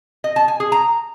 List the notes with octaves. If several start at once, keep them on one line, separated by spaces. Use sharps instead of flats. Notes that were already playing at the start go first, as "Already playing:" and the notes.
D#5
A5
G#5
G#4
A#5